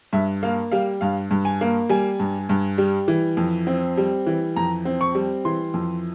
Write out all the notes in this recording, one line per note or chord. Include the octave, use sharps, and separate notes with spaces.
G2 E5
A#3 F5
G3 F5
G2 F5
G2
G#5
A#3
G3 G#5
G2
G2
G3
E3
F2
C4
G3
E3
F2 A#5
C4
C#6
G3
E3 C6
F2